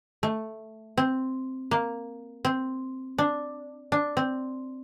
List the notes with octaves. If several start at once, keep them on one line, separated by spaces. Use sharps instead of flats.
A3
C4
A#3
C4
D4
D4
C4